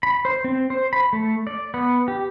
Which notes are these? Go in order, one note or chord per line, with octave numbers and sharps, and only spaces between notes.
B5
C5
C4
C5
B5
A3
D5
B3
G4